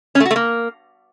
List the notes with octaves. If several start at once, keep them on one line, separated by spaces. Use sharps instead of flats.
C#4
A3
F#4
A3
A#3